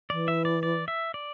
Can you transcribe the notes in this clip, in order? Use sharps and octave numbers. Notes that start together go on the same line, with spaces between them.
E3 D5
E5
D5
D5
E5
D5